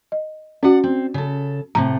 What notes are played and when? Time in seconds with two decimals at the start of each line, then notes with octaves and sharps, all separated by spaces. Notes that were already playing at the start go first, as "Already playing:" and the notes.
0.12 D#5
0.63 C#4 F#4 D5 F#5
0.84 C4
1.14 C#3 A4
1.75 A2 C3 A3 A#5